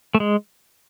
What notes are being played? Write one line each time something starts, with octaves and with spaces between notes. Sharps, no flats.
A3
G#3